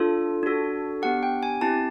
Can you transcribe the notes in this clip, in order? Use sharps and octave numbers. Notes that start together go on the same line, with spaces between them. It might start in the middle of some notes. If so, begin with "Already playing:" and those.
Already playing: D4 F4 A4
D4 F#4 A4
B3 D4 G4 F#5
G5
G#5
C4 E4 G4 A5